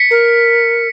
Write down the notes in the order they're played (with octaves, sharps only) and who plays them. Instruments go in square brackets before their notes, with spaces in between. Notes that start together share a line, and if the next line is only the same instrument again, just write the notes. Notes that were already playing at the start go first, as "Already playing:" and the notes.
Already playing: [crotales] B6 C#7
[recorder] A#4